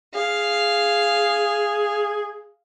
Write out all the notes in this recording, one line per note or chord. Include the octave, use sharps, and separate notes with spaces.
G#4 F5